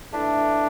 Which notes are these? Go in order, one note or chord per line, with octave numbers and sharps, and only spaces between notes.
A3 D4 E4 B4 E5